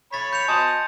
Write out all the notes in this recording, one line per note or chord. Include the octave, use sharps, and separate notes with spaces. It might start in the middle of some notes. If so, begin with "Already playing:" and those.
C#5 B5 A6 B6
G6 C#7 F7
D#5 G#5 A5 C6